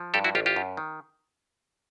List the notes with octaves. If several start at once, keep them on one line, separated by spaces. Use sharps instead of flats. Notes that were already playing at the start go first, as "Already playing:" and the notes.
Already playing: F3
G2 G4 A4
E4 F#4
A1 F4 G4
F4 G4
F#2
D#3